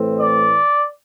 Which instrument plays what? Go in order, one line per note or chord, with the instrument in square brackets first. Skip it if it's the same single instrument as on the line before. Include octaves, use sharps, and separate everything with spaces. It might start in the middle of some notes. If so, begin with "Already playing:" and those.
Already playing: [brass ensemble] A2 E3 A3 C4
D5